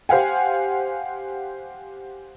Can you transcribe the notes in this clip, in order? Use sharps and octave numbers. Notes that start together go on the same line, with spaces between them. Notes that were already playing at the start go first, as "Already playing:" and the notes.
G4 C5 F5 F#5 G#5